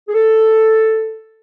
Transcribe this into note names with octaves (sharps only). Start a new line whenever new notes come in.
G#4
A4